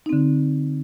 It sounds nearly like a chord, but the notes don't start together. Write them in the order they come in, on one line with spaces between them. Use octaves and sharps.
D#4 C4 D3